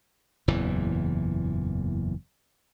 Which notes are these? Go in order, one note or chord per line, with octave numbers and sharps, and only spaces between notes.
F#1 E2 A#2 E3